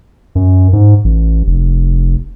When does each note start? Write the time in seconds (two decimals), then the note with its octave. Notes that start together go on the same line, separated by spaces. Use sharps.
0.35 F#2
0.73 G#2
1.04 A1
1.47 F1